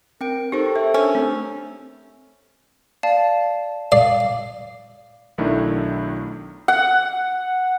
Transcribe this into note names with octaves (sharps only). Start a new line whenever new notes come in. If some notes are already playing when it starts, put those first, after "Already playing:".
C4 A#4 G5 D7
D#4 G4 A4 C5 C#6
A#4 E5
C#4 D4 C5 E6
A3 C4 G4
D5 F5 A5
D5 F5 C7
B1 D#3 A3 D4 E4
F#5